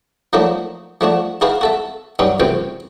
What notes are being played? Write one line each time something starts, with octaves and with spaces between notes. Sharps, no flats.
F3 F#3 A3 A#3 D4 D#4
F3 A3 D4 F#4
D#4 E4 F#4 G#4 B4 F5
F#4 A4 E5
G2 F#3 G3 C#4 D#4
C#2 F#2 C3 E3 C4 G5